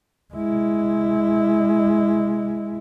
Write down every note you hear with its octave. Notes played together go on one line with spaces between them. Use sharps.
G#3 E4